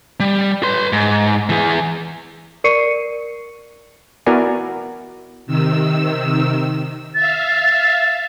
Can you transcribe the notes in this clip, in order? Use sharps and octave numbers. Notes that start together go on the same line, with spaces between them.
G3
B4 C6
G#2
E3 G#4
A#4 D5 C#6 C7 C#7 D#7
B3 E4 F#4 A#4 D5 G#5
C3 D#3 E6
E5 F5 A6